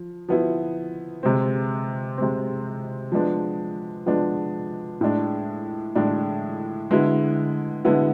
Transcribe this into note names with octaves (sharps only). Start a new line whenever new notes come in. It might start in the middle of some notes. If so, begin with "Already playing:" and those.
Already playing: F3
F3 B3 E4
C3 G#3 C4
C3 G#3 C4
F3 G#3 B3 D4
F3 G#3 B3 D4
A2 G#3 D4
A2 G#3 D4
D3 G#3 B3 E4
D3 G#3 B3 E4